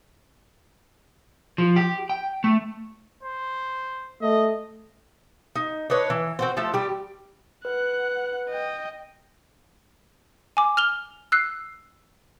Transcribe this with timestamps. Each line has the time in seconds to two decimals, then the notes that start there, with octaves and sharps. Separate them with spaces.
1.58 F3
1.76 G4
2.10 G5
2.44 A3
3.23 C5
4.22 A3 D#5
5.55 D#4
5.90 D4 D#4 B4 C#5
6.10 E3
6.39 C4 F#4 C5
6.57 F3 A3 A4
6.74 G3 G4
7.65 B4 F#5 F#6
8.49 D#5 G5
10.57 G#5 D6
10.77 F6 F7 G7
11.32 E6 F#6 C7